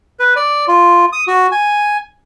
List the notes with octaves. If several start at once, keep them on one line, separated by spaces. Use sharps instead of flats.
B4
D5
F4
D#6
F#4
G#5